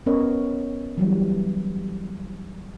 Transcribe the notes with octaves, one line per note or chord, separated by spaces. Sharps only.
B3 C#4 A#4 C#5 D#5
E3 F#3 G3